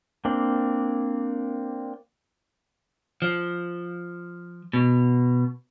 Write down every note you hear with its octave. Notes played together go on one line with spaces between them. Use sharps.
A#3 C4 D4
F3
B2